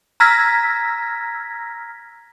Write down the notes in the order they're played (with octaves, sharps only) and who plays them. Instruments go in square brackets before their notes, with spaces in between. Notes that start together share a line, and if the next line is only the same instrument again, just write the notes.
[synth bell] A#5 E6 F6 G#6 A#6 B6